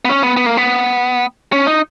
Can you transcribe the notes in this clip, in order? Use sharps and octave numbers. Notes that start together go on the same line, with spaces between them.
B3
C#4
B3
B3
A#3
B3
C#4
D#4